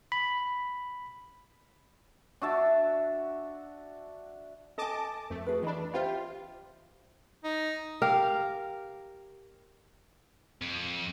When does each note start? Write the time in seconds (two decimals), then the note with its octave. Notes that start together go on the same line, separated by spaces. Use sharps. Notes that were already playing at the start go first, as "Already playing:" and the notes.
0.12 B5
2.42 D4 F#4 E5 A5
4.78 A4 D#5 G#5 A5 D6
5.30 F2 A3
5.46 F#4 G#4 B4
5.63 E3 D4 D#5 B5
5.94 F4 G4 C5 E5
7.44 D#4
8.02 G4 A#4 F5
10.62 F2